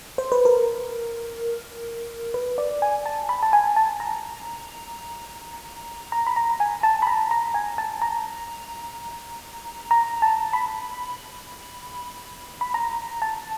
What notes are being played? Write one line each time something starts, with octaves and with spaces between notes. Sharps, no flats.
C5
B4
A#4
B4
D5
G#5
A5
B5
A5
G#5
A5
A#5
A#5
B5
A#5
G#5
A5
B5
A#5
A#5
G#5
A5
A#5
A#5
A5
B5
B5
A#5
A5